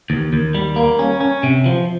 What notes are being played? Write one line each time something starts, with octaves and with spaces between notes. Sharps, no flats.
D#2
D#2
G3
A#3
C#4
C#4
C3
F3